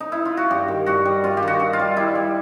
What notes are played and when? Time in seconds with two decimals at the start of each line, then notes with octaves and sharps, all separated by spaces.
0.00 D#4
0.12 E4
0.25 F4
0.37 F#4
0.51 G2 G4
0.68 D#3
0.86 G2 F#4
1.05 G3
1.24 G2 F4
1.37 G4
1.43 D#3 F#4
1.60 G2
1.73 F4
1.79 G3
1.96 G3 E4
2.15 G3